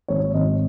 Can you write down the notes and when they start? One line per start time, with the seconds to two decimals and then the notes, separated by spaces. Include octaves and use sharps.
0.08 G#1 C#5
0.34 G#1 D#5